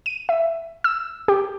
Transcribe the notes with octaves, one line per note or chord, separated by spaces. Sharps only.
D#7
E5
E6
G4